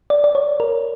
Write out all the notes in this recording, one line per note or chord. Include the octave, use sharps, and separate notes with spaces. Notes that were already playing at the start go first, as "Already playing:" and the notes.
D5
D5
C#5
A#4